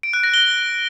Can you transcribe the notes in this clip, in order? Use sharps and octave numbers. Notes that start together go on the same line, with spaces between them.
D7
F#6
A#6
G7